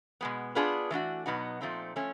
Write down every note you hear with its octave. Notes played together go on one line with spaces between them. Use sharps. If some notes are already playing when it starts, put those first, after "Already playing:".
B2 G#3 B3
B3 D4 F4 G#4 B4
E3 A3 D4 F#4
B2 F#3 B3 D#4 F#4
A#2 F3 A3 C4 D#4
F3 A3 C#4